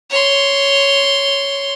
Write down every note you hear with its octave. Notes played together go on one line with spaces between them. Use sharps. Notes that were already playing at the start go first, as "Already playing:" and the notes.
C#5 C6